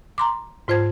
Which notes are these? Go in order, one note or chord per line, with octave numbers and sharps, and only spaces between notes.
A#5 C6 D6
G#2 F4 C5 A5 G#6